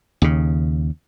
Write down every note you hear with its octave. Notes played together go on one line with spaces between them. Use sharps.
D#2 C#3